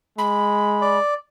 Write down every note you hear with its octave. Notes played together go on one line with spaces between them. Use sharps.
G#3 B5
D5